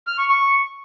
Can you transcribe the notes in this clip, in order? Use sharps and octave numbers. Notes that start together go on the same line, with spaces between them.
F6
C#6
C#6